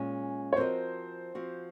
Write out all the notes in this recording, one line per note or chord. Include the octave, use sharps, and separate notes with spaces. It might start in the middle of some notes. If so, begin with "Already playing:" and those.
Already playing: A#2 G#3 C#4
C#5
F3 C4 F#4 A#4 C5 D#5
F3 C4 F#4